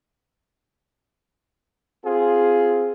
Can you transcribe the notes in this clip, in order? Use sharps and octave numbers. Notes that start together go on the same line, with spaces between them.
C4 F4 G#4